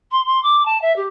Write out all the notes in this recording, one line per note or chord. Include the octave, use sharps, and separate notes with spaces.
C6
C6
D6
A5
E5
G4